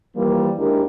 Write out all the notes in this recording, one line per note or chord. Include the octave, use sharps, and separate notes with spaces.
E3 F3 G3 A#3
D#2 G#3 D4 E4 G4 A#4